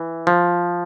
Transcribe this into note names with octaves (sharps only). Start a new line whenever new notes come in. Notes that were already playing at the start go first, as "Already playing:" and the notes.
Already playing: E3
F3